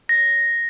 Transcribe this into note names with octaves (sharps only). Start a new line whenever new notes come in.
A#6